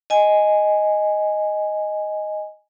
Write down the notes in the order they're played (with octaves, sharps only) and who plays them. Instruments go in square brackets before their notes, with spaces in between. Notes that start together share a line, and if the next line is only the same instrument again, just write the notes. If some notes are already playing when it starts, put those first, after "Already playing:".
[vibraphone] D#5 G#5